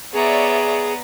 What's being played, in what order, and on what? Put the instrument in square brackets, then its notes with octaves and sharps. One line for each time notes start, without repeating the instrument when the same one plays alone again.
[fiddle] B3 A#5 [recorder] G#4 [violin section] C#5 D5 E5